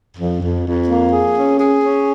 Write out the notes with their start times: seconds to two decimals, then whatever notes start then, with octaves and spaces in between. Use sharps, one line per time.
0.17 F2
0.41 F2
0.65 F2
0.88 A#3
1.12 G#4
1.36 C#4
1.60 G#4
1.83 C#4